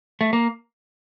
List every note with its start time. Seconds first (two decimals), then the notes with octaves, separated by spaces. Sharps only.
0.21 A3
0.33 A#3